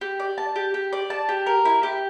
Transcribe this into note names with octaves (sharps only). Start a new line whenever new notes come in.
G4
D5
A5
G4
G4
D5
A5
G4
A#4
E4
G4